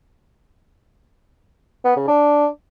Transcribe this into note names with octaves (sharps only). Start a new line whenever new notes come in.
B3
C#3
D4